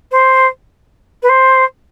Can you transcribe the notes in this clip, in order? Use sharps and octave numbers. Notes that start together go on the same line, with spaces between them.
C5
B4
C5